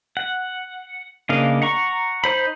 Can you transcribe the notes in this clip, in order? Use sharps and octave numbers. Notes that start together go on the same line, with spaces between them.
F#5
C#3 A#3 D4 D#5 F5
F#5 A#5 C#6
D#4 C5 B5